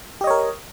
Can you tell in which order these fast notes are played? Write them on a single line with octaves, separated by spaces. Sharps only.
G4 D#5 C#5 A#4